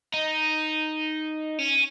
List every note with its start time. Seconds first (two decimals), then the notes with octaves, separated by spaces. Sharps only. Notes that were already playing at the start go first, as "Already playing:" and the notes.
0.14 D#4
1.59 C#4